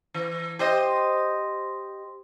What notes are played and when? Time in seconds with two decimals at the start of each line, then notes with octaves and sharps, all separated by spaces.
0.14 E3
0.59 G4 C5 D#5